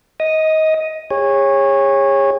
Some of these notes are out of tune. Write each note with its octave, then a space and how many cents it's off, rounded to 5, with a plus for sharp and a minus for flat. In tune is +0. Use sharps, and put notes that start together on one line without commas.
D#5 +20 D#6 -5
G#4 -40 C#5 -15